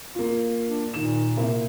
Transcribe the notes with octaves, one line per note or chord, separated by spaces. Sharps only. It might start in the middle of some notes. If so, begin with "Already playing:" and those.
A#3 F4
D4
A#2 D#3 E7
C3 A#3 E4